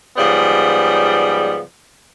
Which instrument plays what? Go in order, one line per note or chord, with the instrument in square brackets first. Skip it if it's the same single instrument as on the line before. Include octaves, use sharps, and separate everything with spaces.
[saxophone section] G#2 C#3 F3 G3 B3